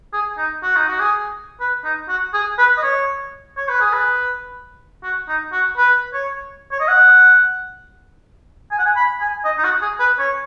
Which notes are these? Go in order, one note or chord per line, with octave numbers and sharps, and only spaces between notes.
G#4
D#4
F#4
D#4
F#4
G#4
B4
D#4
F#4
G#4
B4
D#5
C#5
C#5
B4
G#4
B4
F#4
D#4
F#4
B4
C#5
C#5
D#5
F#5
G#5
F#5
G#5
B5
G#5
D#5
D#4
F#4
G#4
B4
C#5